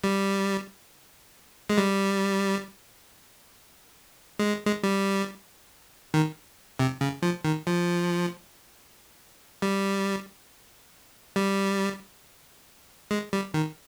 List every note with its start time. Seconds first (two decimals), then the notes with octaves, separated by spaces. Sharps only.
0.04 G3
1.70 G#3
1.78 G3
4.39 G#3
4.66 G#3
4.83 G3
6.14 D#3
6.79 C3
7.01 C#3
7.22 F3
7.45 D#3
7.67 F3
9.62 G3
11.36 G3
13.11 G#3
13.33 G3
13.54 D#3